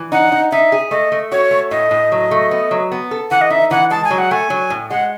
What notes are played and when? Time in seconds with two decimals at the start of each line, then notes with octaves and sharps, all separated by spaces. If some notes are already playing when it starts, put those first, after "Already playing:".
Already playing: E3
0.12 D#4 F#5
0.32 D#4
0.51 D#4 E5
0.72 G#4
0.91 A3 D#5
1.12 A3
1.32 F#4 C#5
1.51 A3
1.71 A2 D#5
1.91 A2
2.12 F#3
2.31 A3
2.51 B3
2.71 F#3
2.92 B3
3.11 A4
3.31 E3 F#5
3.41 D#5
3.50 D#4 E5
3.71 E3 F#5
3.91 G#3 A5
4.04 G#5
4.10 F#3
4.18 F#5
4.31 A3 G#5
4.50 F#3
4.70 A2
4.90 G#3 F#5